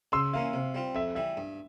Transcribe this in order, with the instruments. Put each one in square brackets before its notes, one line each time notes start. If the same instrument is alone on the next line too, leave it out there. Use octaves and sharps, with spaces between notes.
[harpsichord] C#3 [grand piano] C6 E6
[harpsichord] E3 A#3 C#4 [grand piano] F5
[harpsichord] C3
G3 C4 F4
[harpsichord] F2 [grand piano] E5
[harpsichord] E3 G3 [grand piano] E5
[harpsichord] G2